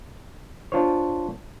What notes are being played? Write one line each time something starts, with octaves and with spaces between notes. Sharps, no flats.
D4 F4 C5 C#5